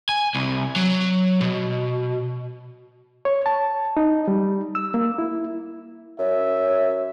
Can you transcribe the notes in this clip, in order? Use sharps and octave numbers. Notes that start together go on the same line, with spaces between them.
G#5
C2
F#3
B2
C#5
A5
D#4
G3
E6
A#3
E4
F#2 C#5 E5